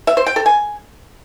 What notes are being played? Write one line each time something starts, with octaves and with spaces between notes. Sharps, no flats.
E5
C5
G5
A4
G#5